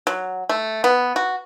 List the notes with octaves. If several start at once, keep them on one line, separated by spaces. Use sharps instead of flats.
F#3
A3
B3
F#4